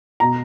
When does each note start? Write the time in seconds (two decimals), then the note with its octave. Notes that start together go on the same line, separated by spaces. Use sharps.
0.20 B2 A#5